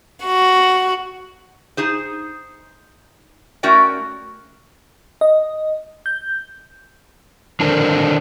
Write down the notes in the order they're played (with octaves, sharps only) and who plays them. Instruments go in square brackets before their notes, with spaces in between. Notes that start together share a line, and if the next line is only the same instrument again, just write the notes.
[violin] F#4
[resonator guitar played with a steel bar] D#4 G#4 C5
A3 C#4 F#4 A#4 D5 G5
[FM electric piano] D#5
G6
[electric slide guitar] D3 D#3 D4 A4 A#4 C5